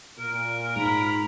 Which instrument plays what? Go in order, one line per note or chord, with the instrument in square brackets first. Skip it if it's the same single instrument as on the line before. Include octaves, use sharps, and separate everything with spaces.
[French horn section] A#2 [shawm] A#4
[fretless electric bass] G#2 [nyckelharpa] A#5 B5